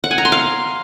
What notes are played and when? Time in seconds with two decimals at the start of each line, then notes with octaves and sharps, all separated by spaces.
0.04 F#5
0.11 G#5
0.18 A#5
0.25 C6
0.32 F5